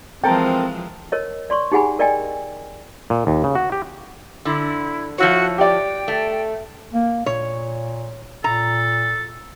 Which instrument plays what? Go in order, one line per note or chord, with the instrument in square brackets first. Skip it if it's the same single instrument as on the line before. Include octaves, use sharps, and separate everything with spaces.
[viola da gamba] E3 F3 G#3 [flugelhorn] C4 [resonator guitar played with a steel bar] A4 A#4 [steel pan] G5
[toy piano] A#4 C#5 D#5
D5 C6 C#6
D#4 G4 G#4 F#5 G#5 B5
A#4 D5 D#5 G5 G#5
[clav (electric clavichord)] A#2
D#2
C#3
F#4
G4
[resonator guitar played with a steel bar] D3 [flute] E4
[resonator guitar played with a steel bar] F3 E4 C#5 [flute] F#4
[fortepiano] G4 D5 [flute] G5
[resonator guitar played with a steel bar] A3
[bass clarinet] A#3
[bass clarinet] A#2 [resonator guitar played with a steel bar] C#5
[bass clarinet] A#2 [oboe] A4 [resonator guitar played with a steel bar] A#5